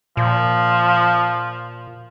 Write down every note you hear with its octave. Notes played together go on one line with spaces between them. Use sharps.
A#2 F3